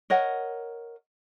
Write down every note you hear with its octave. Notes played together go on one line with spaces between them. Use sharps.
A#4 C#5 D#5 F#5